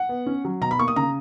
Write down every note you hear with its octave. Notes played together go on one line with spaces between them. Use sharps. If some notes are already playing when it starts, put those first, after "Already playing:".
Already playing: F#5
B3
C#4
F#3
B2 A#5
B5
A#3 C#6
D#6
C#3 A#5